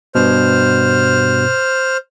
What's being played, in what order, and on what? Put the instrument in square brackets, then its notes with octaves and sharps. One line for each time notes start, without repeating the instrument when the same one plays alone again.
[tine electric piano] G2 B2 [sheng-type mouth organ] C5 F6